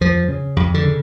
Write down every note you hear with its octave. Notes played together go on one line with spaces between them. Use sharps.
F2 F3
C#3
F2
D3
C#3